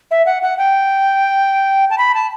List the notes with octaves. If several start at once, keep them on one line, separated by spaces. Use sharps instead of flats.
E5
F#5
F#5
G5
A5
B5
A5